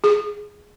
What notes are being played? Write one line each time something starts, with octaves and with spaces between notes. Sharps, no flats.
G#4